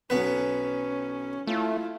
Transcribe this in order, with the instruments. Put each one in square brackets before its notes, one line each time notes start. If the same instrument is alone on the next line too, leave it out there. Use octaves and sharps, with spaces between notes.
[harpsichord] B1 B3 B4 [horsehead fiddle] C#4
[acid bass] A3 [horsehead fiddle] E4 F4